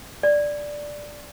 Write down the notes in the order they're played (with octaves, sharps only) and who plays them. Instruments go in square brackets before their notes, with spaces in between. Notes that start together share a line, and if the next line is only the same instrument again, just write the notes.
[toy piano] D5